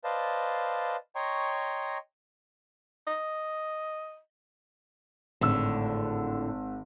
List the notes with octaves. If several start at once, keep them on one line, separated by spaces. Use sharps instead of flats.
B4 C5 D5 D#5 F5 A5
C#5 D#5 G5 A#5 C6 C#6
D#5
G#1 A2 D3 E6